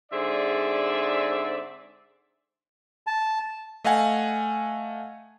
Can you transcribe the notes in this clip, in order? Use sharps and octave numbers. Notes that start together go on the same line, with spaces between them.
G#2 D3 C4 G#4 D5 E5
A5
A3 D#5 F5 F#5 G#5